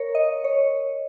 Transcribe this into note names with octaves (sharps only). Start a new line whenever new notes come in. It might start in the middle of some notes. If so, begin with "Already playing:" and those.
Already playing: A#4 C#5
D#5
C#5